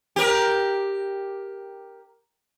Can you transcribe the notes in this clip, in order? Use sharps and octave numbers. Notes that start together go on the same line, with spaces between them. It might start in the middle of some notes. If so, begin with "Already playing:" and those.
G4 A#4